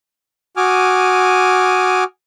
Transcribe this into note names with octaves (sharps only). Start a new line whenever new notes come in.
F#4 G#5 D6 D#6 F6